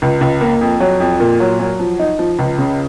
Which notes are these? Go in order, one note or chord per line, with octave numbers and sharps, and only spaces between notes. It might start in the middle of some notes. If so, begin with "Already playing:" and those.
C#2
C#2
A#3
F2
F#3
F2
A#2
F#3
F#3
F3
D#4
F3
C#2
C#3